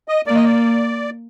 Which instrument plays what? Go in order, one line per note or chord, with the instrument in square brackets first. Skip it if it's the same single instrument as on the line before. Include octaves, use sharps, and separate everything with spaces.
[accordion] D#5
[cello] A#3 [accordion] D5
[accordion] D#5
D5